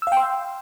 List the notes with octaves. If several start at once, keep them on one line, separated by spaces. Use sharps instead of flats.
F5 G5 C6 E6